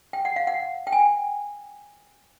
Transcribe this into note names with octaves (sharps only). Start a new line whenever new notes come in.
G5
F#5
F5
F#5
G5
G#5